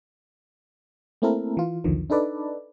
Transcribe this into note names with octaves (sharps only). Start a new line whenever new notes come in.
A3 A#3 C4 E4 A4 A#4
E3 F4
B1 E2 B2 D3 D#3 F3
D4 D#4 A4 B4 D5